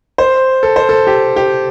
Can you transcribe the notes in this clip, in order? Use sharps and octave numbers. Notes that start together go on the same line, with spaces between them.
C5
A4
C5
A4
G4
G4